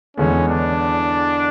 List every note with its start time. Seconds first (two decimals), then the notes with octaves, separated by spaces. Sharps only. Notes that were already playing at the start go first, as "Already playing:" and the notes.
0.17 E2 D3 G#3 B3 C#4
0.48 D4